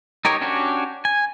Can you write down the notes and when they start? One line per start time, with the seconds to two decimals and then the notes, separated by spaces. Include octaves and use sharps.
0.25 D#4 G4 A#4 C#5
0.41 C#4 D4 F#4 G4 C#5
1.05 G#5